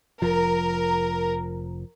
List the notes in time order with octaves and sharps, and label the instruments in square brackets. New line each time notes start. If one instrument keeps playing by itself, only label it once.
[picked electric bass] F1 F3 [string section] A#4